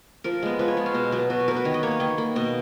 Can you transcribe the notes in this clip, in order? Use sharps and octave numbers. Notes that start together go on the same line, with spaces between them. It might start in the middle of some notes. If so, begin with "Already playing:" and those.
F3 A#4
G#3 B3
F3 B4
C#5
G#3 B3
F5
B2 D#5
F#3 B3
B2 F#4
B4
F#3 B3 A#4
B4
D#3 C#5
D#5
A#3 C#5
B4
D#3 D#5
A#3
B2 D#5